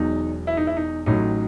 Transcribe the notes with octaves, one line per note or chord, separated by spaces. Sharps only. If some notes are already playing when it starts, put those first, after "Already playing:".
Already playing: E1 E2 B2 F#3 D#4
E4
D#4
E4
D#4
A1 A2 F#3 D#4